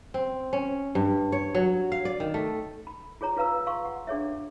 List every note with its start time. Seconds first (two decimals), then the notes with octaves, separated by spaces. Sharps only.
0.14 C4
0.53 C#4
0.95 G2
1.32 C#5
1.55 F#3
1.92 F5
2.05 D5
2.20 D#3
2.34 A3
2.87 B5
3.21 F4 G#4 C#5 A#5
3.37 F4 B4 F5 A#5 E6
3.67 F5 C6 C#6
3.85 F#5
4.07 D4 G#4 C#5 E5